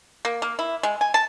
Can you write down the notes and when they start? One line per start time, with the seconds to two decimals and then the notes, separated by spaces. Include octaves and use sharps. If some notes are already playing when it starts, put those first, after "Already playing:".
0.25 A#3
0.42 A#3
0.59 E4
0.83 G#3
1.01 G#5
1.14 A5